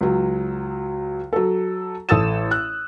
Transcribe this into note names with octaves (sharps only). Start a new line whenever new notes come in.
C#2 F#3
F#3 A4
A1 A4 D#6 E6 A6 E7
F#6